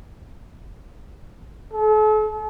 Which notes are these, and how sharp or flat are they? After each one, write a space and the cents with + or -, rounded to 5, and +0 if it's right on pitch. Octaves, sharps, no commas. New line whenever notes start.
A4 -40